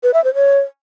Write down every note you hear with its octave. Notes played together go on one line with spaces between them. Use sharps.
B4
E5
C5
C#5